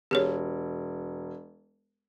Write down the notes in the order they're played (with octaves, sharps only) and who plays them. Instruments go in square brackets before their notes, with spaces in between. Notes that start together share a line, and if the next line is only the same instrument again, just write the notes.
[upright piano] E1 [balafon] G4 G#4 C#5